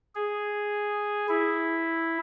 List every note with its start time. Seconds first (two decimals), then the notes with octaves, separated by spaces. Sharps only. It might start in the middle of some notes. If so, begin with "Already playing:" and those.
0.15 G#4
1.29 E4